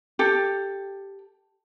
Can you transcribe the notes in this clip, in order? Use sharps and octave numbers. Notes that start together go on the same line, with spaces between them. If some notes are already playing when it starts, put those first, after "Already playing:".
G4 A4